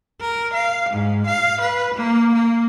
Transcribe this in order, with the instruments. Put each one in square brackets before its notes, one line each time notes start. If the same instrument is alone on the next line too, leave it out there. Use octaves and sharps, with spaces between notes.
[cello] A#4
F5
G#2
F5
B4
A#3
A#3